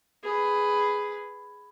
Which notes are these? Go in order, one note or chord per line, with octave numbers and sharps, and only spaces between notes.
G#4 B4